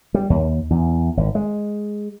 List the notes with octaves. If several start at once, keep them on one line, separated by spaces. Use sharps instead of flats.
G3
D#2
E2
G#1
G#3